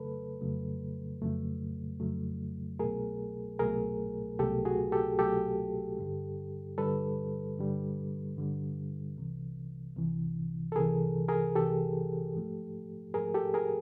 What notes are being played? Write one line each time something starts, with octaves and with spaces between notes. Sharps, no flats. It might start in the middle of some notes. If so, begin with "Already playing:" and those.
Already playing: F2 C#3 F#3 A3 A4 B4
F2 C#3 F#3 A3
F2 C#3 F#3 A3
F2 C#3 F#3 A3
C2 B2 F#3 A3 G#4 A#4
C2 B2 F#3 A3 G#4 A#4
C2 B2 F#3 A3 G4 A4
F#4 G#4
G4 A4
C2 B2 F#3 A3 G4 A4
G2 D3 G3
G2 D3 G3 A4 B4
G2 D3 G3
G2 D3 G3
C2 C3 E3
C2 C3 E3
A4
C2 C3 E3 G#4 A#4
G#4 A#4
C2 C3 E3 G4 A4
G#2 F3 A3
G#2 F3 A3 G#4 A#4
G4 A4
G#4 A#4